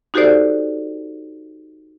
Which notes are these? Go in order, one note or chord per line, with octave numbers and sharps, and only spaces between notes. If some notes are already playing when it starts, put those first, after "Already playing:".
D#4 F#4 G4 A4 C5 D5